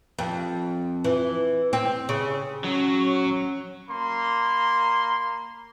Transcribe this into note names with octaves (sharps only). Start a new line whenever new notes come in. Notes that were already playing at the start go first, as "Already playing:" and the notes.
F2
E3
C4
C#3
F#3 C#4
A#3 B5 C6